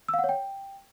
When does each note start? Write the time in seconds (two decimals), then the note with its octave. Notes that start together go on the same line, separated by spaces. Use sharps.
0.08 E6
0.14 F5
0.19 F#5
0.24 C#5
0.29 G5